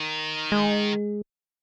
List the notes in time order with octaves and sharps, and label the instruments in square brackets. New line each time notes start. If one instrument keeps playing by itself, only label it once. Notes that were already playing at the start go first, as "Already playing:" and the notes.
Already playing: [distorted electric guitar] D#3
[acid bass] G#3